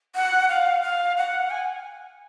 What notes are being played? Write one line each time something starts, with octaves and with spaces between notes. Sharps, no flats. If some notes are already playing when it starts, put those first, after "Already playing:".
F#5
F5
F5
F#5
G#5